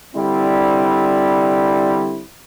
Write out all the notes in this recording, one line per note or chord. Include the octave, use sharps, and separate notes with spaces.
D3 G3 C4 E4